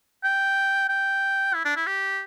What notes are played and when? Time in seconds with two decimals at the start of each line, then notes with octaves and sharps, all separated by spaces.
0.24 G5
0.89 G5
1.55 E4
1.65 D4
1.76 E4
1.87 G4